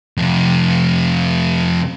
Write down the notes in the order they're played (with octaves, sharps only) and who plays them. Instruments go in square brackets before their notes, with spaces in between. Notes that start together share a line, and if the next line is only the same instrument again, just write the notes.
[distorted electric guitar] F2 C3